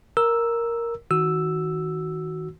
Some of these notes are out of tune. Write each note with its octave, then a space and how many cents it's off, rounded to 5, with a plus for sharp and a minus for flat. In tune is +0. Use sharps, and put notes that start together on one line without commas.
A#4 +0 E6 +0
D#3 +30 F#4 +0 E6 +0